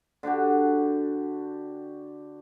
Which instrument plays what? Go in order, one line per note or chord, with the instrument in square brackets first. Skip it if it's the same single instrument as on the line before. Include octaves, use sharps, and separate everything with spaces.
[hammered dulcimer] D3 D4 F#4 G4